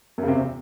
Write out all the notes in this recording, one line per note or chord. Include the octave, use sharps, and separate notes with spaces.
F#2
C#3
C3
E2